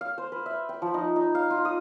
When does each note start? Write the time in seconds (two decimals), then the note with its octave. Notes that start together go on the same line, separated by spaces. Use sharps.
0.01 F5
0.18 C5
0.32 B4
0.46 E5
0.69 G5
0.82 F3
0.94 D#4
1.16 D#4
1.35 F5
1.50 F4
1.65 D#6